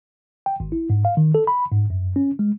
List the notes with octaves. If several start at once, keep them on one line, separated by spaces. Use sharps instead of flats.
G5
G#1
E4
G#2
F5
D#3
A4
B5
G#2
F#2
C#4
G#3